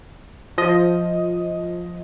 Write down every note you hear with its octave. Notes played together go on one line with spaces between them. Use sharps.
F3 D#5